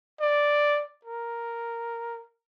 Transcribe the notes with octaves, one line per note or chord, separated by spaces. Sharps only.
D5
A#4